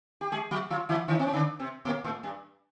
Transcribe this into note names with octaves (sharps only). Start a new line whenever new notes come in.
G4
G#3 G#4
F#3 F#4
F3 F4
E3 E4
D#3 D#4
C4
C#4
D3 D4
C3 C4
A#2 A#3
A2 A3
G2 G3